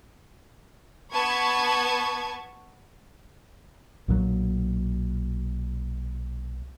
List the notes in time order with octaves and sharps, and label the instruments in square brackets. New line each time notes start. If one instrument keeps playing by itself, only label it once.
[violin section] B3 B4 A5 C#6 G#6
[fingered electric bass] B1 A#2 D3 F#3